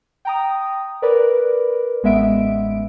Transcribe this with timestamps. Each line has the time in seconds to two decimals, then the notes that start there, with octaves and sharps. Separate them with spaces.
0.25 G5 A#5 D#6
1.02 A#4 B4 D5
2.03 A1 G#3 B3 E5 D7